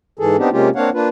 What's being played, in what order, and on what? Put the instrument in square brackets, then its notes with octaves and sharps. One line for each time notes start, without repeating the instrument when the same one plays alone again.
[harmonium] G#2 E3 G#4 A4
B3 C4 D4 D#4 G4
C3 G#3 A#3 C#4 F4 G4
A#3 C4 D4 C#5 F5 F#5
A#3 D4 F4 B4